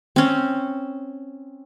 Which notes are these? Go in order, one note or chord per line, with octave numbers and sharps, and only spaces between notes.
C4 C#4